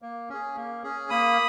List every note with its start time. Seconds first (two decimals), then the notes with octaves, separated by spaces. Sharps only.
0.02 A#3
0.29 C#4 G#4
0.56 A#3
0.83 C#4 G#4
1.10 A#3 B5 D#6